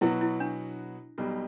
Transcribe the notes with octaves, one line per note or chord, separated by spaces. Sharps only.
B2 F#3 B3 E4 F#4
E4
D4
B1 B2 G3